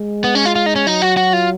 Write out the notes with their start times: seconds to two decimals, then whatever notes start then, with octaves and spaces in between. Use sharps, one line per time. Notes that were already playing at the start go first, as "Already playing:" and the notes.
Already playing: G#3
0.24 B3
0.35 C#4
0.45 F4
0.55 F4
0.66 D#4
0.76 C#4
0.87 F#3 D#4
1.02 F#4
1.17 F#4
1.33 F4